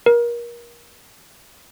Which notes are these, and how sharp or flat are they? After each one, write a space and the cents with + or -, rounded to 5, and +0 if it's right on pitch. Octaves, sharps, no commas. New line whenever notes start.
A#4 +30